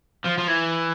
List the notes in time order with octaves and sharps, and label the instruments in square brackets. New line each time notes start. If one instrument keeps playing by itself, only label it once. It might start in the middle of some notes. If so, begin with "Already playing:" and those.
[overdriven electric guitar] F3
F3
E3